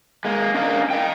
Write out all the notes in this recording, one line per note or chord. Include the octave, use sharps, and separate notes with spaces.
G#3 A#3
C#4 D4 A#4 D#5 F5
D#5 G5